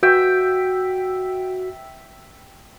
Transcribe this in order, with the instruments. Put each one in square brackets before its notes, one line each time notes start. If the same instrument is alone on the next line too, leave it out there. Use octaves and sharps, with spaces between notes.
[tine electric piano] F#4 [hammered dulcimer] E5 G5